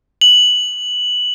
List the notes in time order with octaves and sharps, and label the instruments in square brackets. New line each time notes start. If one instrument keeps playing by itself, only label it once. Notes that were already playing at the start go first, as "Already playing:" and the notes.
[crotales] F#7